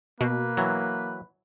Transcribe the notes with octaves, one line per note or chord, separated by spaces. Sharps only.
B2 A#3 B4
E3 F#3